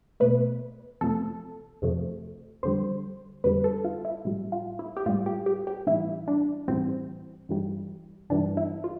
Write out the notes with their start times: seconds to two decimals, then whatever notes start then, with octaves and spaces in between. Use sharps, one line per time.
0.20 B2 A3 B4
1.01 F2 C3 F3 A3 A4
1.82 F2 C3 F3 A3
2.63 F2 D3 G3 C5
3.44 F2 D3 G3 B4
3.64 A4
3.84 F4
4.05 E4
4.25 A2 G3
4.52 F4
4.79 E4
4.97 G4
5.06 A2 F4
5.09 G3
5.26 G4
5.46 G4
5.67 G4
5.87 A2 E3 G3 E4
6.28 D4
6.68 A2 E3 G3 C4
7.49 G2 E3 G3
8.30 G2 E3 G3 D4
8.57 E4
8.84 F4